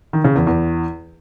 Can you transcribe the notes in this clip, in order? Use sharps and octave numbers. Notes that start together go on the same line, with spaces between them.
D#3
C#3
E2
E2